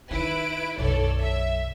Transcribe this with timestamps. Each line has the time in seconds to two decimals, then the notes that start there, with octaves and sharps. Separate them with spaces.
0.11 D#3 E4 B4 D7
0.78 B1 F#2 A4 C#5 D5
1.21 E5